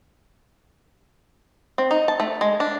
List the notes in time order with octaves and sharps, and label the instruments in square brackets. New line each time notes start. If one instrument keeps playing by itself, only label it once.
[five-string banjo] C4
D#4
A5
A3
G#3
D4